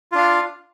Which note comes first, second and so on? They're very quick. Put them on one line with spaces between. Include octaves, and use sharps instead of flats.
F4 D4 F5